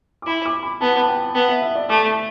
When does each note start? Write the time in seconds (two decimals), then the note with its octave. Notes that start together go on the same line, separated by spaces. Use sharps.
0.22 D6
0.27 E4 B5
0.45 D6
0.63 B5
0.81 B3 A5
1.02 A5
1.08 G5
1.35 B3 A5
1.49 E5
1.62 E5
1.75 D5
1.89 A3 D6